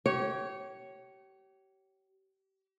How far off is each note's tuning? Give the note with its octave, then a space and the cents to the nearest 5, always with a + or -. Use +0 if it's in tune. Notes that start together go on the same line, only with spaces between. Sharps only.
G4 -35 C#5 +0